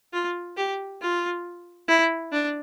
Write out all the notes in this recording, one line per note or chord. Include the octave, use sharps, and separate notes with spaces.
F4
G4
F4
E4
D4